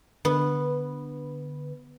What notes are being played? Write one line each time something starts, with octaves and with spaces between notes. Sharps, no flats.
D3 B3 B4